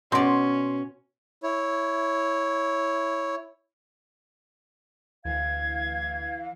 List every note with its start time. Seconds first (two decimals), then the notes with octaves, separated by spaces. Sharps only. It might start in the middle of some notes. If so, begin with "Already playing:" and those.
0.12 B2 C#4 D5 C6
1.43 E4 C#5
5.25 D2 E3 F5 G#6